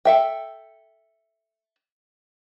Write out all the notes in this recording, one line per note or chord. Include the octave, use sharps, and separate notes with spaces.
A4 E5 G5